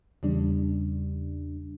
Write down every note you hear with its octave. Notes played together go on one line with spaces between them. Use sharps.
E2 C#3 G3 D4